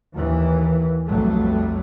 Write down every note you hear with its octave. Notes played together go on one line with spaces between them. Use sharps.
D#2 E3
B1 F2 F#3 G3 A3